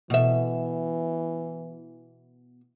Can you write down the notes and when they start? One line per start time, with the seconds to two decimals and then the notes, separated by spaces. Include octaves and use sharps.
0.10 B2 E3 E5